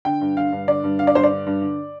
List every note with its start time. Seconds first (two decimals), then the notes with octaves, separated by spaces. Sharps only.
0.05 D3 G5
0.21 G2
0.37 D3 F5
0.52 G2
0.68 D3 D5
0.84 G2
0.99 D3 F5
1.07 D5
1.15 G2 C5
1.24 D5
1.31 D3
1.46 G2
1.62 D3